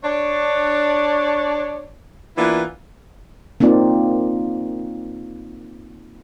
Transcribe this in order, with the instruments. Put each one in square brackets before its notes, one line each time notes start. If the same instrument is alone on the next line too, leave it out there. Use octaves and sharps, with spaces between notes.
[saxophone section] D4 C#5 D5
E3 A#3 B3 D4 E4 F4
[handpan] A#3 C4 D#4 F4 D5